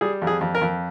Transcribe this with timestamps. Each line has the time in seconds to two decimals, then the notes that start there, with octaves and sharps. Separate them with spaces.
0.01 G3 G#4
0.22 F2
0.27 G#4
0.41 F2
0.55 A#4
0.61 F2